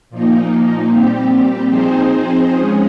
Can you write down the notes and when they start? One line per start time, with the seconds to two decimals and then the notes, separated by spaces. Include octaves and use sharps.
0.10 A#2 F3 A#3 D#4
0.89 A#2 G3 C4 G4
1.69 F3 C4 D#4 G#4 C5
2.50 F3 G#3 C#4 G#4